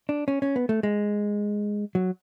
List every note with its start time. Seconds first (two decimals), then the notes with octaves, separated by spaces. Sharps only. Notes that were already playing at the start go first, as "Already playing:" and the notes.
0.09 D4
0.28 C#4
0.42 C#4
0.56 B3
0.69 A3
0.83 G#3
1.95 F#3